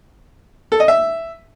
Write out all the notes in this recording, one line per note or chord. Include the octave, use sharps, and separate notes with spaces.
A4
D#5
E5